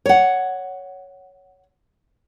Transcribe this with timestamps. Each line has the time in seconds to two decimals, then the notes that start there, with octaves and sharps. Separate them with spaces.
0.06 C#5 F#5